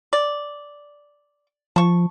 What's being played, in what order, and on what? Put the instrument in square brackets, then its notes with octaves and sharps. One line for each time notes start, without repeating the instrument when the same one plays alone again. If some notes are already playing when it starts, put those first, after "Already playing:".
[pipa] D5
[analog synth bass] F3 [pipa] A5 C#6